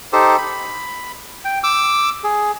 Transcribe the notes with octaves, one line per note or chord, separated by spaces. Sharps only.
D#4 G4 A4 C5
B5
G5
D6 E6
G#4